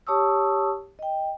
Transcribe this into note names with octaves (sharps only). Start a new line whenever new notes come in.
G4 C#5 A5 C#6 D#6 E6
D#5 G5